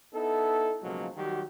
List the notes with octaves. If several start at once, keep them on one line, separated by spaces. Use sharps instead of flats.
B3 D#4 E4 A4
B1 C#3 F3 F#3 G#3 A#3
D#3 F#3 G3 F#4 G4